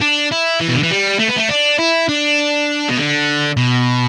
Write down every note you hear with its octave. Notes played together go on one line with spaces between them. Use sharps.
D4
E4
E3
B2
D3
E3
G3
A3
B3
A3
D4
E4
D4
B2
D3
B2